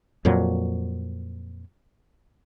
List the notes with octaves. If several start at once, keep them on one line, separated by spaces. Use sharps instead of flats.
F2 A#2 F#3